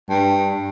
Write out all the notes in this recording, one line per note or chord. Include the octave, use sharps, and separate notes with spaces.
G2